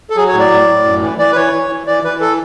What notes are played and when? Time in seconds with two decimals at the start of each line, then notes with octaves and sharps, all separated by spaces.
0.10 A4
0.16 F#3 G#4
0.28 C#5
0.33 A2
0.39 D5
0.50 A2
0.67 A2
0.84 F#2
1.01 E3
1.18 E3 D5
1.32 B4
1.36 E3 C#5
1.53 E3
1.70 E3
1.87 E3 D5
2.04 E3 B4
2.21 A4